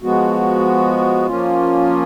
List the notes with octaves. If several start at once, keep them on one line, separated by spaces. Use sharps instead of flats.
F3 G#3 B3 F#4
F3 A#3 C#4 F4